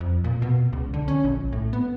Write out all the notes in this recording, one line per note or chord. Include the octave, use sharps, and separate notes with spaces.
F2
A#2
B2
C#2
D3
C#4
A#1
A2
B3